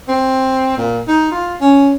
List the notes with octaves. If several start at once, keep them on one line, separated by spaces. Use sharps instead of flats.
C4
A#2
D#4
F4
C#4